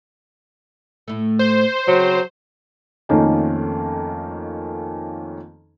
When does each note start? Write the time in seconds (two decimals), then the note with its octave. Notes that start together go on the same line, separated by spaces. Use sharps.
1.08 A2 A3
1.39 C5
1.88 C#3 F#3 C4
3.09 F2 D#3 A3 A#3 C#4 D#4